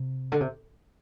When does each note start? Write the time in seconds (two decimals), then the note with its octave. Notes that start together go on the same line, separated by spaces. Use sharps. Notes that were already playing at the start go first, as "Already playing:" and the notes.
Already playing: C3
0.32 D3
0.41 C3